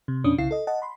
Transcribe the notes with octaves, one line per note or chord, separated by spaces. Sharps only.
C3
F2 B2 C#4 D4 D#6
C2 C#3 E4 F5 C7
A4 D#5
D#5 F#5 A5
B5 C6